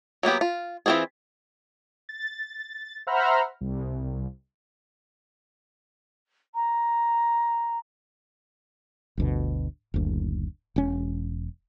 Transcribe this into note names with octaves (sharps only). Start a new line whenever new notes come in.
F#3 A#3 B3 G4
F4
E3 B3 C4 F4 G#4
A6
C5 E5 F#5 A#5 B5 F6
C2
A#5
G1 D2 B2
F#1 D2
E1 C#4